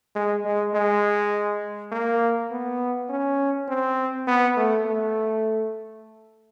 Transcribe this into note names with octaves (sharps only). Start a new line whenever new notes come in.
G#3
G#3
G#3
A#3
B3
C#4
C4
B3
A3
A3